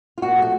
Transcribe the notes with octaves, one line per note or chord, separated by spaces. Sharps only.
F4
A#2 F#4
F3 A3 F#4